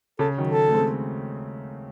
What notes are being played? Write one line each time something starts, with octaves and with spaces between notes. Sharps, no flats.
C#3 A4
D#3 F#3
A4
A3
G#3 C4